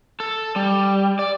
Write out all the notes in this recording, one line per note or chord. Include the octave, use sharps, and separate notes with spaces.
A4
G3
D5